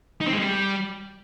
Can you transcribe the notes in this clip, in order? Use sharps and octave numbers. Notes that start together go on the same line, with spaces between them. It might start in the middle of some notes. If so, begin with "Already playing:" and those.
D#4
C4
G#3
G3